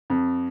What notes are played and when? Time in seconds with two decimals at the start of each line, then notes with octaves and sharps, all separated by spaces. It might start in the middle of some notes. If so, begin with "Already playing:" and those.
0.10 F2